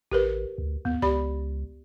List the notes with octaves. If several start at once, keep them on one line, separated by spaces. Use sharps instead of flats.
A1 G4 A#4 B4
D2
D#2 B3
C#2 G4 D5 B5